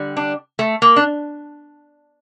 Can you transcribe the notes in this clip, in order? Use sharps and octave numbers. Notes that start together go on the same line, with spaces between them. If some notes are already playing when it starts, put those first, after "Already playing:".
Already playing: D3 G3
D4
A3
A#3
D4